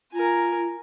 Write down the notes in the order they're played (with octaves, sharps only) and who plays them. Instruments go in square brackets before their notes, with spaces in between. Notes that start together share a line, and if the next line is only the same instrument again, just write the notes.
[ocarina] F4 [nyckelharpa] A#4 G#5